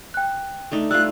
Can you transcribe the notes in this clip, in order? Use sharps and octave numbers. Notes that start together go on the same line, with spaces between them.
G5 F#6
A3 D4 D#4
G3 A3 F4 E6 F#6